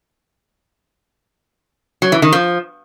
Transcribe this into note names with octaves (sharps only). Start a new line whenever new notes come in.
F#3
E3
D#3
F3